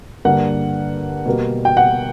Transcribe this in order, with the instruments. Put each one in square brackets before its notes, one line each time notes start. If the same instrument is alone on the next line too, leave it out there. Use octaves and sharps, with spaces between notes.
[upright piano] G2 D3 A#3 D4 F#5
B2 G3 A#3
G5
F#5